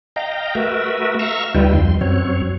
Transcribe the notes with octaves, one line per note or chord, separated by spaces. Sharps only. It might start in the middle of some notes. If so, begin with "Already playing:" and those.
D#5 F5 G5 A#5
A3 F#4 A#4 B4 E5
E5 F5 A#5 C#6 E6
D2 G3 D#4 F4 B4 G5
F2 C6
F#2 F#3 C4 C#5